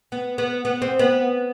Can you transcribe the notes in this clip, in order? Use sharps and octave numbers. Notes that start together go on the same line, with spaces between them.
B3
B3
B3
C4
B3